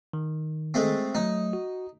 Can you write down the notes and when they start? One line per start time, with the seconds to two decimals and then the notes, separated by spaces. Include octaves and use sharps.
0.13 D#3
0.74 G#3 A3 C4
1.15 F#3 A3 D#4
1.53 F#4